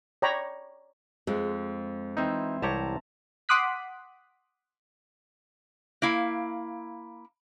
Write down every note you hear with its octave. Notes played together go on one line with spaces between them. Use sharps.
C#5 D5 G5 A#5 B5
F2 G#3
E3 C4 D#4
C2 G4 C#5 A5 A#5
F#5 C6 D6 D#6 F#6 B6
A#3 E4 F5